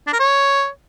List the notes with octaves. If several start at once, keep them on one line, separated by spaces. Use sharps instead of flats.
D4
A#4
C#5